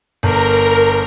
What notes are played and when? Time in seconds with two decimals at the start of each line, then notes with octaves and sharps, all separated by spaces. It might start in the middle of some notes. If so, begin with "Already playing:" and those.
0.23 G1 A#4